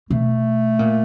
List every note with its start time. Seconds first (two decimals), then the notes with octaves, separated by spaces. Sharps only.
0.10 B2 A3
0.79 A#2